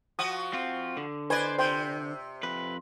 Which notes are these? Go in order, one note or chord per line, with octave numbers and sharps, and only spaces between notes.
F3 F#4 D#6
C4 F4
D3
B4 C5 D5 G#5
C3 C5 G5
F2 B4